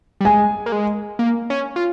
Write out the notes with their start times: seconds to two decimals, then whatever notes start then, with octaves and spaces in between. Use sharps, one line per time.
0.21 G3
0.25 G#3 G#5
0.66 A#3
0.72 G#3
1.19 A#3
1.50 C#4
1.76 F4